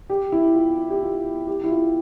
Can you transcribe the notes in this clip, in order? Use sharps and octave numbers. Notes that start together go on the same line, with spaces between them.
G4
E4
F4
F4
G4
F4
G4
E4
F4